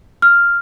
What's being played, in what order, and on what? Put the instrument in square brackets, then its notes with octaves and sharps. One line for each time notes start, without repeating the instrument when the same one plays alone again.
[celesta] F6